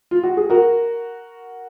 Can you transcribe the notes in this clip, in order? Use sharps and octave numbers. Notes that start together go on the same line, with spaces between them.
F4
F#4
G#4
F#4 A#4